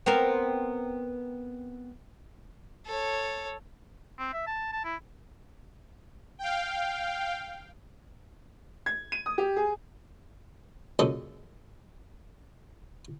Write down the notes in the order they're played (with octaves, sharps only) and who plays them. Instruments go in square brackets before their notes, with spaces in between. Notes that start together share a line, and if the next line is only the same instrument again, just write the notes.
[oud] B3 C4 A#4
[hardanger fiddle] A4 C#5
[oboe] C4
E5
A5
A5
E4
[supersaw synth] F5 G5
[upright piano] G#6
D#7
D#6
G4
G#4
[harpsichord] F#2 A#2 C#3 A4 D#5